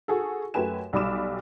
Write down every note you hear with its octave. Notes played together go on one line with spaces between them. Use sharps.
F#4 G#4 A4
F#2 A3 G4 B4 G#5 E7
B1 G3 D5 B5 D6 E7